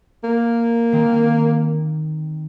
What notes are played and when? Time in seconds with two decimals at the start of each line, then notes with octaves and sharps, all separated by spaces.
0.24 A#3
0.92 D#3 C4